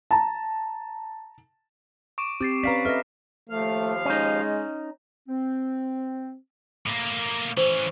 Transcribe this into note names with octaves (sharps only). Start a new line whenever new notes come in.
A5 A#5
C#6 D6 D7 E7
C4 G4 D6 A6 C7
C#4 B4 D5 F5 A#5 B6 C7
A4 B4 D#5 E5 F6 A#6
D#2 F3 A3 F5
G#3 C#4 D#4
C4
A2 A#3
E3 C#4 C5